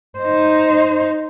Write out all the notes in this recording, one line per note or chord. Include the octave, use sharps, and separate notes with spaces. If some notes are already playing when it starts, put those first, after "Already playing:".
D#4 C5